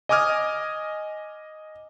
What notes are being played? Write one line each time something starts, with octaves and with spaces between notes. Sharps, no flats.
D#5 G#5 D6 D#6 F6 G#6